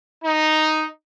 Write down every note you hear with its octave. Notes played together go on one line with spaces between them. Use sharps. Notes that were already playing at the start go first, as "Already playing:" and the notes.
D#4